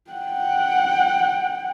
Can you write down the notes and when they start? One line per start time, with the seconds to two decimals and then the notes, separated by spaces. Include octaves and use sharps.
0.11 F#5 G5